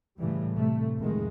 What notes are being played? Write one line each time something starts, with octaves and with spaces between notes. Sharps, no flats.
A2 C#3 E3 G3
C3 A3
F1 D#3 G#3